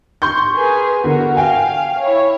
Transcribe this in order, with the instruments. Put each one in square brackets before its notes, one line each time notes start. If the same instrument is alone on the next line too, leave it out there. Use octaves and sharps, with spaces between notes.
[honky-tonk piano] C6 C#6 G6
[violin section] G#4 A#4 B4
[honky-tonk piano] E2 D3 [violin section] F#4 A#4
[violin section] F5 [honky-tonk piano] G5 G#5
[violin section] E4 C#5